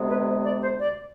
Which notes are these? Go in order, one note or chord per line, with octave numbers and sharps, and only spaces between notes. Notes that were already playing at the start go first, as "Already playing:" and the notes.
Already playing: D2 C3 G#3 B3
B4
D5
C5
D5